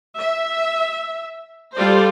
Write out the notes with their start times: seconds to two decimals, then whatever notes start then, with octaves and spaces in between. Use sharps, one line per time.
0.18 E5
1.74 G3 F4 A4 C5 D5